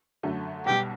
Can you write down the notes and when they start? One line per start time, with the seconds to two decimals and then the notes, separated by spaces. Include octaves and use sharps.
0.23 F#2 D3 F#3 A3
0.66 B1 B2 G3 G4